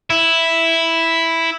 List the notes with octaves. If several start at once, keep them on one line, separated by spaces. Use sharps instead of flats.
E4